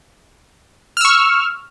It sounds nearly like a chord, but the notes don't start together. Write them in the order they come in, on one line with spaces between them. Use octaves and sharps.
F6 E6 C#6